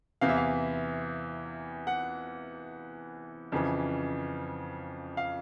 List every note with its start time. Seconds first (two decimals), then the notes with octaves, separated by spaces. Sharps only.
0.21 E2 C3 E3 F5
0.29 E5
0.37 F5
1.87 F#5
3.52 F2 C#3 E3
5.17 F5